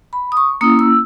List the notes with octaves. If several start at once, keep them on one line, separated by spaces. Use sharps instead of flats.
B5
D#6
C#6
A#3 C#4 E4 D#6
E6